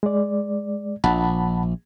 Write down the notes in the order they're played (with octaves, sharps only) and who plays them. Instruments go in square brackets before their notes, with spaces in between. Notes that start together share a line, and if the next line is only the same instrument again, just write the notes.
[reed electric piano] G#3 D5
[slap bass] A#1 [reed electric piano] F#5 A5 B5